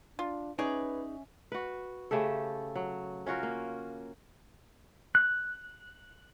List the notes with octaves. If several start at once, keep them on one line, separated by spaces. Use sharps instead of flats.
D4 F4
C#4 D#4 G#4 B4 C#5 D5 E5
F#4 B4
C#3 A3 G4 A4
F#3
C#4 F4 F#4 A#4
A#3
F#6